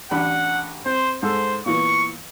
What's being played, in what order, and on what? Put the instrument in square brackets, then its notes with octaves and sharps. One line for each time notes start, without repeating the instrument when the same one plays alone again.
[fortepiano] A1 D4 B5 [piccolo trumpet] F#5
[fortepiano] C4 [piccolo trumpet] C5
[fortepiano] G#2 A4 E6 [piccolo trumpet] C5
[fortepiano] A#2 E3 B3 [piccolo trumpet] C#6